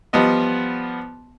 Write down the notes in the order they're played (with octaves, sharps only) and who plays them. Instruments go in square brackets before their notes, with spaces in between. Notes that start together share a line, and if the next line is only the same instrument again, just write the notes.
[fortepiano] F3 G3 B3 D#5